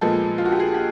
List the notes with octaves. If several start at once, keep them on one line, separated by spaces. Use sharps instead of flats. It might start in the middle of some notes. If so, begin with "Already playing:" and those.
A#2 F3 G#3 B3 A4
F4
F#4
G4
G#4
G4